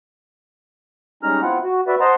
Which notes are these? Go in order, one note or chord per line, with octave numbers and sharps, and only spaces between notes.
G3 G#3 C#4 D#4 A#5 F6
B3 C4 E4 F4 F#5
F#4
F#4 B4 D5 E5
C5 D#5 F#5 A5 A#5 C6